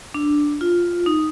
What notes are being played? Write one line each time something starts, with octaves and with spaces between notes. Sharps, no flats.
D4
F4
D#4